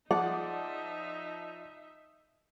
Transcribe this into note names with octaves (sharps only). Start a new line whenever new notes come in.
F3 D#4 G#4 D5 E5 F#5